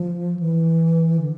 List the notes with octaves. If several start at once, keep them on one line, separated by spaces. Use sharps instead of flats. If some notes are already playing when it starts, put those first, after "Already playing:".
Already playing: F3
E3
D3